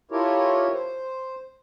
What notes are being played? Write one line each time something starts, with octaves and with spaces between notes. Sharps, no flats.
E4 F4 G4 A4 A#4 C#5
C5